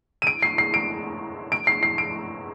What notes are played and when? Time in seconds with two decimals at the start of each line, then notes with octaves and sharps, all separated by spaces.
0.22 D#7
0.27 D7
0.43 C7
0.58 C7
0.74 D7
1.52 D7
1.67 C7
1.83 C7
1.98 D7